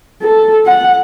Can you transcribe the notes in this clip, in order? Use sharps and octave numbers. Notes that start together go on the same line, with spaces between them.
A4
F#5